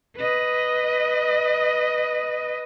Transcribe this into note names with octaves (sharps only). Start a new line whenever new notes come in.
B4 D#5